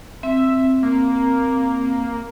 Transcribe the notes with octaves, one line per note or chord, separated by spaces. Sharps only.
C4 E5
A#3